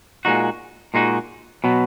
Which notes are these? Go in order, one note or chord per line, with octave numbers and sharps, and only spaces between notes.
A#2 G#3 D#4 F#4
A#2 G#3 D#4 F#4
B2 F#3 B3